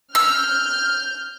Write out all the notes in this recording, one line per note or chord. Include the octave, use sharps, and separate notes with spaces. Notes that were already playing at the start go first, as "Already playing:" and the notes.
E6 F6 G6